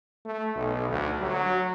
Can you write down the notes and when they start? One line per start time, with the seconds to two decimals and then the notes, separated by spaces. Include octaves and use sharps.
0.25 A3
0.56 B1
0.90 D2
1.21 F#3